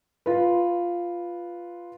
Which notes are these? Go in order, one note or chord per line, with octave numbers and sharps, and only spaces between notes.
F4 B4